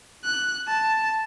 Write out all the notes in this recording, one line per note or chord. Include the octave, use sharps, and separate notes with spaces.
F#6
A5